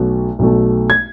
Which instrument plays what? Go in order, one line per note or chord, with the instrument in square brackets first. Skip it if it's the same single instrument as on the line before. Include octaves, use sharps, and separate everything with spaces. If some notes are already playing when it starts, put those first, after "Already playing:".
Already playing: [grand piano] B1 B2 A3
B1 B2 A3
G#6